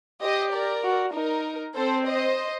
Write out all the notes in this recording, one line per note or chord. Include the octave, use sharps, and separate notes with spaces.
G4 C5 D#5
A#4 D5
F#4
D#4 A#4
C4 A4 C5
C5 D#5